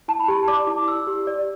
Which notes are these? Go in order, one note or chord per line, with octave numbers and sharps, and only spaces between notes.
E4 A5
B5
G4 A5
D5 D6
E4
E4 E6
G4
D5